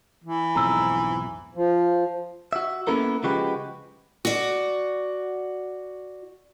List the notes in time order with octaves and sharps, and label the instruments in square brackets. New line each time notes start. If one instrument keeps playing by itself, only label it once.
[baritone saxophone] E3
[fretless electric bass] B1 F2 G#2 [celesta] A#5 E6
[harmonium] F3
[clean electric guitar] F#4 E5
A#3 B3 C#4 E4 A4 A#4
C#3 F3 G#3 F#4 G4 B4
[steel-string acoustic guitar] F#4 D5